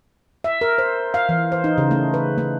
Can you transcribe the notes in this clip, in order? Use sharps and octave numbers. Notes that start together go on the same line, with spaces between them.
E5
A#4
C5
F5
E3
C5
D#4
C#3
A3
B4
A3